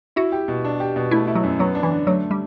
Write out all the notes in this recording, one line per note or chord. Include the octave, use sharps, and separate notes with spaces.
E4 F#4
G4
B2
D4
G4
B2
A3 E4
E4
F#3
F#2
F#3 B3
D4
E3
D3
F#3 A3
G3